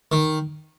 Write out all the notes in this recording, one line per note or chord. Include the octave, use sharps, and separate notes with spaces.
D#3